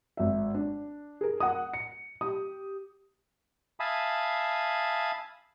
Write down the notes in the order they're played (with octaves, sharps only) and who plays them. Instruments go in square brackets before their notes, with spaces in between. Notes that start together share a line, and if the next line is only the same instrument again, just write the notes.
[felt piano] G#1 E5
D4
G#4 A#4
A#4 F#5 D#6
C#7
G4 D#6
[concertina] E5 F5 G#5 A5 B5 D#6